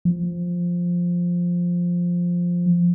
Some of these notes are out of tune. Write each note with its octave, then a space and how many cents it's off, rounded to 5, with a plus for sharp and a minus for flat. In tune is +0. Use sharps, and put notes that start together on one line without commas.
F3 +5